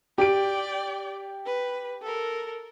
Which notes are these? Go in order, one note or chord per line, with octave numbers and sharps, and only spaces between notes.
G4 D5 G5 D7
B4
A4 A#4